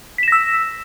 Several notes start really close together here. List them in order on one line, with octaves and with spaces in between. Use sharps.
B6 E7 A#6 E6